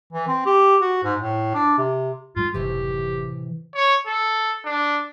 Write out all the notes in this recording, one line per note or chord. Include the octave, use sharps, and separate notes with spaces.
E3
C4
G4
F#4
G#2
A2
D4
C3
G#2 G3 F4
F#1 A2 C3 E3 G4
C#5
A4
D4